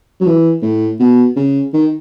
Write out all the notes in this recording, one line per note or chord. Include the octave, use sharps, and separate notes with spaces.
F#3
E3
A2
B2
C#3
D#3